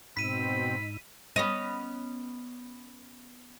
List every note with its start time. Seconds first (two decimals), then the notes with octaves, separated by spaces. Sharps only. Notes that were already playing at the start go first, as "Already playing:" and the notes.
0.17 G#2 B2 C4 D#4 B5 E6 B6 D#7
1.36 B3 C#4 D#5